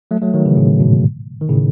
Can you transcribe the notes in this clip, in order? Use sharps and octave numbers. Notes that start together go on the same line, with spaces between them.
F#3 A3
F#3 A3
D#3 F#3
C#3 E3
A2 C#3
G#2 B2
D#3
A2 C#3